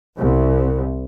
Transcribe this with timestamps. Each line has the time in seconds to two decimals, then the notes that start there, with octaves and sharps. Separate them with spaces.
0.17 C2